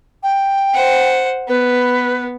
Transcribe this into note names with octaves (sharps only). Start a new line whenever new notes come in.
G5
C5 F#5
B3 B4